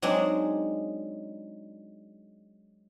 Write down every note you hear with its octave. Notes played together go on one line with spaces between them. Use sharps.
F#3 G#3 C4 D4 D#4 C#5